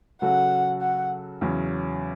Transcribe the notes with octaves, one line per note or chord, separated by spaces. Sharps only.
C#3 F#3 C#4 F#4 A4 F#5
F#5
E2 C#3 F#3 C#4